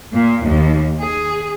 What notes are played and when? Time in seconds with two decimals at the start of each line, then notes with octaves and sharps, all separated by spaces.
0.14 A#2
0.44 D#2
1.02 G#4